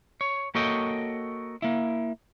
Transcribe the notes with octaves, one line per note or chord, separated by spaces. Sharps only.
C#5
A#3 F#4 A4 C#5 D#5 G5
A#3 E4